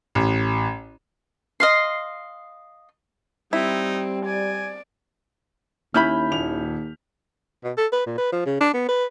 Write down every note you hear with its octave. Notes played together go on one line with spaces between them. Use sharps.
A1
D#5 F5 C6
G3 C4 D#4 E4
D5 G#5
D#2 C#4 E4 B5 F6 G6 B6
D#1 F7
B2
A4
B4
A#2
B4
F3
C#3
D4
B3
B4